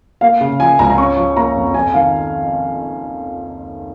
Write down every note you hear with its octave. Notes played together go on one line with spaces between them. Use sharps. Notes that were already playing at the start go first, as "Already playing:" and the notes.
A#3 F5
C#3
F3 G#5
C#2 A#5
A#5
C#4 C#6
F3
A#3 A#5
F2
F2 G#5
D#3 F5